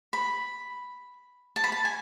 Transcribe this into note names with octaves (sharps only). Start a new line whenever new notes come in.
B5
A5
B5
A5
G#5